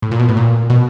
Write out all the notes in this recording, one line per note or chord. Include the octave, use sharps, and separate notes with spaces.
A2
A#2
B2
A2
A#2
B2